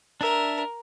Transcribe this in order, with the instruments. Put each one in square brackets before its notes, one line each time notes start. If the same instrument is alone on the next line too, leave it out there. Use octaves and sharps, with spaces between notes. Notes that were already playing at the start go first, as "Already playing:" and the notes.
[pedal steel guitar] D4 E5 [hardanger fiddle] A#4